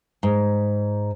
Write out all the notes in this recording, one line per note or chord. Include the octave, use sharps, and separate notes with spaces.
G#2